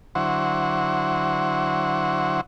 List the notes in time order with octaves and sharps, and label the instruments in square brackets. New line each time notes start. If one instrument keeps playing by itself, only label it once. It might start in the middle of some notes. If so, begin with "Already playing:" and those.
[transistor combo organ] D3 F#3 E4 C5 F#5 C#6